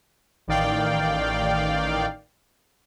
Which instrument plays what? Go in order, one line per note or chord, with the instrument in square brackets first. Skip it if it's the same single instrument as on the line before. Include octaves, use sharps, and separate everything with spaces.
[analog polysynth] A1 D#3 D5 F5 G5